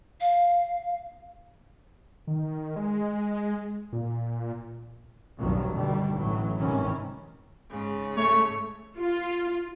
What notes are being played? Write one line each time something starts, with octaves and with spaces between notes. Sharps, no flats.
F5
D#3
G#3
A#2
F1 B1 G2 D#3 F3 F#3
G2 B2 D3 D#3 G3
A1 A2 E3 F#3
G#1 C3 D#3 E3 C#4
G#2 C#3
A3 C#5
F4